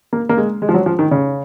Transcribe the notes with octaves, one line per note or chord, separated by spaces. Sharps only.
A#3
A#3
G#3
G#3
F3
F#3
F3
D#3
C#3